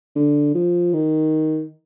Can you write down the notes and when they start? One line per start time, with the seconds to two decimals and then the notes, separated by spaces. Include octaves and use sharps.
0.16 D3
0.55 F3
0.93 D#3